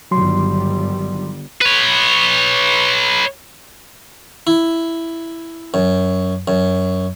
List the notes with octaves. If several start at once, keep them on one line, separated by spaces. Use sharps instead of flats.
G1 D#3 F#3 G3 C6
B4 C#5
E4
F#2
F#2